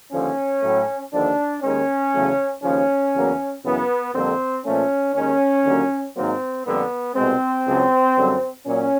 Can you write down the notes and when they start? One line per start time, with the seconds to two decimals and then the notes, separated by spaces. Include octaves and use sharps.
0.12 D#2 D3 F3 C#4
0.63 A2 F#3 A3
1.12 D#2 D3 F3 D4
1.63 D#2 D#3 G#3 C#4
2.13 E2 C#3 F#3 A3
2.63 D#2 C#3 F3 C#4
3.14 E2 C#3 F#3 A#3
3.64 F#2 C#3 E3 B3
4.13 F2 D3 G3 A#3 C4
4.64 A#2 F3 A3 C#4
5.14 D#2 D#3 G#3 C#4
5.64 D#2 D3 F#3 A#3
6.15 G#2 D#3 F#3 A#3 C4
6.65 F2 D3 G3 A#3 B3
7.15 C2 B2 G#3 C4
7.65 C#2 C#3 F#3
8.16 F#2 D3 G3
8.66 A#2 F#3 C#4